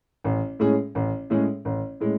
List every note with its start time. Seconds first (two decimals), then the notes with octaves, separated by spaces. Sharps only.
0.24 A1
0.60 A2 G#3 C#4 G#4
0.95 A1
1.30 A2 G#3 C#4 G#4
1.65 A1
2.00 A2 G#3 C#4